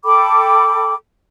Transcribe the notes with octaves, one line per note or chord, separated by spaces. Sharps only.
A4 G5 B5 D6